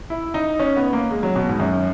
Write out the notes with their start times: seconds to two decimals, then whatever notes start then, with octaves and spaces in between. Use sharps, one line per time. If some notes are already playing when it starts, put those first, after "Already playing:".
0.10 E4
0.34 D#4
0.59 C#4
0.77 B3
0.93 A#3
1.11 G#3
1.23 F#3
1.36 B2
1.48 G#2
1.60 F#2